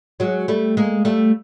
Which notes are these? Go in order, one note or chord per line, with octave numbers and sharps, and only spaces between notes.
F#3 G#3
G3 A3
G#3 A#3
G3 A3